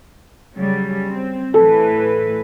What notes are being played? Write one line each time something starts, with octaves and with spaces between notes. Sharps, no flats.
C#3 F#3 G3
C4
A2 E3 A4 B4